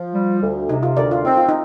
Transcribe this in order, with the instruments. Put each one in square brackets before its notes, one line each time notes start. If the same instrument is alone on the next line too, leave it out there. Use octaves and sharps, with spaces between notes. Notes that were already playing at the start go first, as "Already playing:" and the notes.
Already playing: [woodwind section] F3
G3
D2
[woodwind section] C3 [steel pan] D#4
[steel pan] F4
[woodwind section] D2 [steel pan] A#4 D5
[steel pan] F4
[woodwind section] C4 [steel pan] D#4
[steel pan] F4
D#4